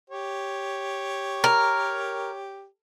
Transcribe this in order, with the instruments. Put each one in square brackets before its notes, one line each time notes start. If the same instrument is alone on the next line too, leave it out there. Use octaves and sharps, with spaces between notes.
[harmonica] G4 C#5
[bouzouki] A#4